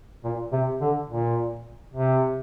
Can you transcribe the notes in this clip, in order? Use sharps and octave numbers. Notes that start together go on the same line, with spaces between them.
A#2
C3
D3
A#2
C3